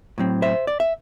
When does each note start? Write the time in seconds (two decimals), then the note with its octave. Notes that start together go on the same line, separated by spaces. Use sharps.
0.18 A2 F#3 C4
0.42 C5 E5
0.67 D5
0.80 E5